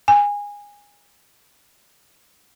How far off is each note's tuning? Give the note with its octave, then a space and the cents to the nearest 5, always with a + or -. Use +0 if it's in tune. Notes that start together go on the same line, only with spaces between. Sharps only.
G#5 -20